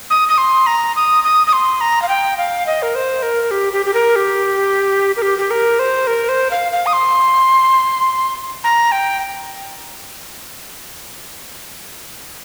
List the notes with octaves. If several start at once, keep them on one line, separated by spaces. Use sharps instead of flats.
D#6
D#6
C6
A#5
D#6
D#6
D#6
C6
A#5
F5
G5
F5
D#5
A#4
C5
A#4
G4
G4
G4
A#4
G4
A#4
G4
G4
A#4
C5
A#4
C5
F5
F5
D#6
C6
A#5
G5